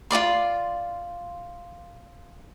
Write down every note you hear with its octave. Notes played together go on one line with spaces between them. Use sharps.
F4 G#4 D5 C6